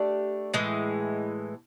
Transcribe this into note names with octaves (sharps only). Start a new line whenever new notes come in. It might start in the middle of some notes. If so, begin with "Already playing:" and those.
Already playing: A3 D4 G4
A2 E3 G#3